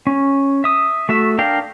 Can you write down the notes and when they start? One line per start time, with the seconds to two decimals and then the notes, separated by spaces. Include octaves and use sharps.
0.07 C#4
0.64 E5 D#6
1.09 A3 F#4 E5
1.38 D4 A#4 F5 G5